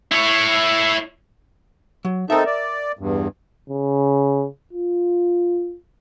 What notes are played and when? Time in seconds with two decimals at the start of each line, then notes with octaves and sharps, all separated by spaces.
0.11 E4 C#5
2.05 F#3
2.30 C4 D#4 A4 A#4 E5
2.46 D5
2.99 E2 G2
3.69 C#3
4.73 F4